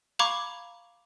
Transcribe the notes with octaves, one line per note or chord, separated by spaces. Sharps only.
F5 A#5 B5 C#6 D6 G#6